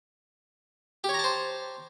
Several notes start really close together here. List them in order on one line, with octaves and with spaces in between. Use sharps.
G4 C#5 A#5 A5 C5